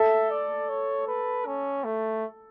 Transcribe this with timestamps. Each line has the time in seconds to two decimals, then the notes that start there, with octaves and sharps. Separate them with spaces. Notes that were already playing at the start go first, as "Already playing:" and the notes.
Already playing: A4 E5
0.30 D5
0.69 C#5
1.08 B4
1.46 C#4
1.84 A3